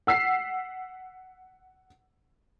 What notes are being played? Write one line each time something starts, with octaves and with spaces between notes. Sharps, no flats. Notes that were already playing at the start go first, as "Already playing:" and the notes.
F#5 E6 B6 C7